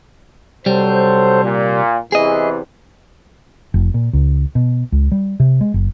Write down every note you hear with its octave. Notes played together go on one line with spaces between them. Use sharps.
C2 F#3 G3 A4 C5
A#2
E2 C3 E3 G#4 D#5
F1
A#2
C#2
B2
C#2
G3
C3
G#3
F#1